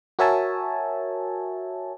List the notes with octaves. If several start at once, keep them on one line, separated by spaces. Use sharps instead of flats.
F#4 A#4 C#5 E5 G#5 A5